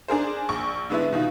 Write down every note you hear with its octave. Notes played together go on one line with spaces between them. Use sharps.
D4 G#4 A#4 C5
A#1 C#6
D3 G#3 B3 D4 E4
B2 D#3 F4